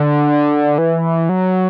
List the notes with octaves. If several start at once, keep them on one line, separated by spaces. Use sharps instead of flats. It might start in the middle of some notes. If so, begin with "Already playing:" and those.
Already playing: D3
E3
F#3